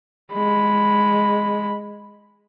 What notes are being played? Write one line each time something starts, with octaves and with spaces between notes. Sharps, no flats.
G#3 B5